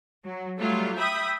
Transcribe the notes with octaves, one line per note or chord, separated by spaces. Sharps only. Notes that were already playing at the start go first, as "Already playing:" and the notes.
F#3
F#3 G3 A3 F4
E5 G5 B5 D#6